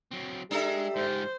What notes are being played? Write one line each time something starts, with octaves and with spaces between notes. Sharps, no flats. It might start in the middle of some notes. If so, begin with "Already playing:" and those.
F#3 C4
G#3 D4 G4 A4 E5
G#2 F4 C5